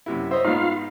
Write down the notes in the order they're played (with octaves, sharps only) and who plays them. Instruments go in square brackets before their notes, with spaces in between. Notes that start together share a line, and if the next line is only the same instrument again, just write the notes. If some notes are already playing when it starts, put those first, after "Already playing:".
[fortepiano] F#2 C3 E4
[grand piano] C5 [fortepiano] C#5 D#5 E5
[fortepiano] G#2 B3 [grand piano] D#4 [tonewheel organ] F4 F5